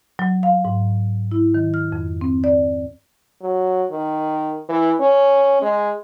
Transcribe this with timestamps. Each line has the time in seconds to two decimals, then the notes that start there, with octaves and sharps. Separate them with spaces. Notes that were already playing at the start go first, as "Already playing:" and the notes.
0.19 F#3
0.43 F5
0.65 G#2
1.32 E4
1.54 D#3
1.74 F6
1.92 F2
2.21 C4
2.44 D5
3.42 F#3
3.91 D#3
4.69 E3
5.01 C#4
5.62 G#3